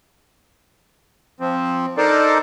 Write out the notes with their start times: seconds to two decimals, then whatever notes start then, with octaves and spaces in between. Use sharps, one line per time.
1.40 F3 C4
1.97 D4 D#4 A4 A#4 C5 D5